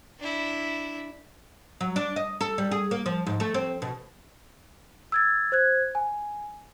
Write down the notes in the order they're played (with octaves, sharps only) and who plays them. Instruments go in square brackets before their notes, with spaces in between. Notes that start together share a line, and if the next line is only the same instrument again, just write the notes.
[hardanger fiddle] D4 E4
[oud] F#3
D4
D#5
A4
G3
G#4
A#3
F3
G#2
A3
C4
B2
[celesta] E6 G#6 A6
C5 F#6 G#6
G#5